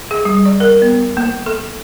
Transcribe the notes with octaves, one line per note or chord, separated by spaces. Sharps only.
G#4
G3
D5
A#4
B3
A#3
A4